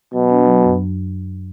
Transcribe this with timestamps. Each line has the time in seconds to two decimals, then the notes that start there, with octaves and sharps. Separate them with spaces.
0.13 B2 F#3
0.30 D4
0.46 F#3
0.63 F#2